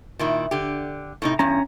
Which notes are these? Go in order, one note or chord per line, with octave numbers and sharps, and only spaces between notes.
A#2 D#3 E4
D3 G4
A2 C3 D#4
E2 G2 C#4 A#5